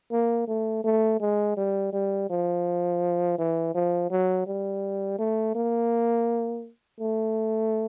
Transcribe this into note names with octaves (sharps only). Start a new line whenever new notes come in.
A#3
A3
A3
G#3
G3
G3
F3
E3
F3
F#3
G3
A3
A#3
A3